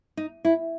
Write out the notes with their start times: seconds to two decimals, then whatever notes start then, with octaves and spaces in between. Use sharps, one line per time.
0.17 D#4
0.45 E4